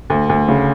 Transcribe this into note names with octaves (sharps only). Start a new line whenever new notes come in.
D2
D2
C#3